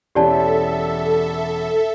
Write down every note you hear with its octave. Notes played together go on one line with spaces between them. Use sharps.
E1 E3 C#4 G4 A4 D5 E5 A5